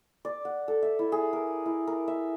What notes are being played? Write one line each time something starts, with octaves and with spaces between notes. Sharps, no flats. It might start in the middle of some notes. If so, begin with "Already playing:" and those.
D5
F#5
A4
E5
E4
G#4
A#4
E4
A#4
E5